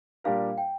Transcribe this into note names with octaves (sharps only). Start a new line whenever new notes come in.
A#2 G3 D4 G4 A#4 F5
G5